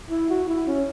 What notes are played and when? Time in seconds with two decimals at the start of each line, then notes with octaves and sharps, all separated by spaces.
0.10 E4
0.30 F#4
0.48 E4
0.67 C#4